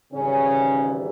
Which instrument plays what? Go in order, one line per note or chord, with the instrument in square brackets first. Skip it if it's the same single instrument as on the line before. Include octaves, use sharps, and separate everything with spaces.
[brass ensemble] G#1 G#2 C#3 E3 G3 C#4